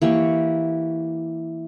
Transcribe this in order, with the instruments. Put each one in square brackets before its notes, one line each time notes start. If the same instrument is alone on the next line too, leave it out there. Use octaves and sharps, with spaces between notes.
[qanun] E3 A#3 G4 C#6